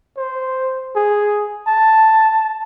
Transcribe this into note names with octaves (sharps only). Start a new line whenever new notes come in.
C5
G#4
A5